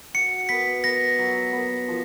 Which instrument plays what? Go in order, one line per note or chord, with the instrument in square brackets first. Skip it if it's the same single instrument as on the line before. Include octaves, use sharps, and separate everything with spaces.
[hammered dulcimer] F#4 [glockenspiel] C#7
[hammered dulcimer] B3 [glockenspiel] B6
[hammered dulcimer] B3 [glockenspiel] A#6
[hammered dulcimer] F#3
B3
F3